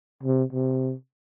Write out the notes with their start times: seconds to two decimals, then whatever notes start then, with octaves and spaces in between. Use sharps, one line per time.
0.23 C3
0.53 C3